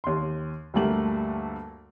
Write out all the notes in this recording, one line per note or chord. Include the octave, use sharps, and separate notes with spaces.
D#2 C6
D2 G2 G3 A3 A#3 F#7